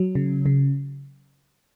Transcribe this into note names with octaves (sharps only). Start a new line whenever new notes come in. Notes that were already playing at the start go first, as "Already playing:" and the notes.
Already playing: F#3
C#3
C#3